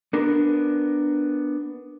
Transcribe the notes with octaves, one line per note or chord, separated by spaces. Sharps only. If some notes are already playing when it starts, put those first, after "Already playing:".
B3 D4 A#4